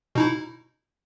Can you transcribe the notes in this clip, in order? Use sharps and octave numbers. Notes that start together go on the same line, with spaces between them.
B2 D#4 E4